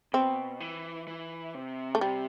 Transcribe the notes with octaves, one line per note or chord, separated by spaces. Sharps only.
B2 C4
E3
E3
C3
A3
C3 G3